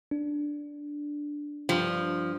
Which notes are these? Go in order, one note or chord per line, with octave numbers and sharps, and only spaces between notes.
D4
G2 F3 G5 A5